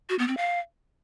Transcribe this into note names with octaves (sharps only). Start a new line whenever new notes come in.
F#4
B3
C4
F5